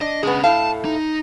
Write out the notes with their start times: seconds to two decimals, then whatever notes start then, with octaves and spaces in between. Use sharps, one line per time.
0.01 D4 D#5
0.23 G#3 B3 C#4 G#4
0.44 A2 A3 F5 A5
0.85 D#4